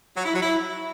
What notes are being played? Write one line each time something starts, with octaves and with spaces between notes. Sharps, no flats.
F#3
E4
F#3
E4